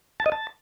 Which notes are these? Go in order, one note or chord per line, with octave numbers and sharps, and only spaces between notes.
A5
D#5
A5